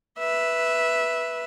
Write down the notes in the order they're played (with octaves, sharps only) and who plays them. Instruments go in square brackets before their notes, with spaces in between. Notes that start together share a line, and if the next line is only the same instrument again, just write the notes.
[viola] B4 E5